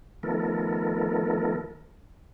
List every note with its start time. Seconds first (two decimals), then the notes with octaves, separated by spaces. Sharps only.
0.23 D#3 F3 A3 B3 A4 A#4